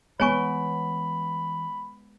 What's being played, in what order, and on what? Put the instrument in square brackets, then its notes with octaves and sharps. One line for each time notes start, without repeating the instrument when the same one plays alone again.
[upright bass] E3 G3 [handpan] G#3 B3 [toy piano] C#5 G#5 C#6 [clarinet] B5